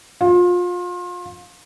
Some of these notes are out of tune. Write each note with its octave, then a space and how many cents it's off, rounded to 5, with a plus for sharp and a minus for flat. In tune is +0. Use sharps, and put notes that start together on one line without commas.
F4 +30